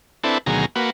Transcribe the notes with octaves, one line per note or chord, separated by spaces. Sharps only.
C4 D4 E4 A4 B4
D2 B2 D#3 F#3 G#4 A#5
A#3 F#4 B4